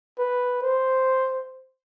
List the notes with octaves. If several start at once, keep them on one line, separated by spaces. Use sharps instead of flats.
B4
C5